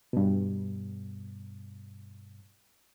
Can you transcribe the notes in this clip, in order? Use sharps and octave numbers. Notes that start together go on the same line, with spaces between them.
G2 B2